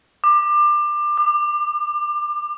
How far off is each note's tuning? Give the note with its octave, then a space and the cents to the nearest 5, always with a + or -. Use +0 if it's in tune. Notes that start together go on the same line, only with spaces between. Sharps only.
D6 +25
D6 +45